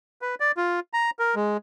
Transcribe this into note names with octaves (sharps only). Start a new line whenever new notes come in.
B4
D5
F4
A#5
A#4
G#3